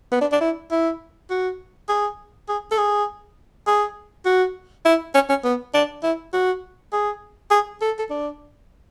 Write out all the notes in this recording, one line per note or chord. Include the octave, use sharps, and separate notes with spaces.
B3
D4
D4
E4
E4
F#4
G#4
G#4
A4
G#4
G#4
F#4
E4
C#4
C#4
B3
D4
E4
F#4
G#4
G#4
A4
A4
D4